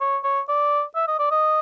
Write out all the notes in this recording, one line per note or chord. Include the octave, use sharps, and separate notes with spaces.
C#5
C#5
D5
E5
D#5
D5
D#5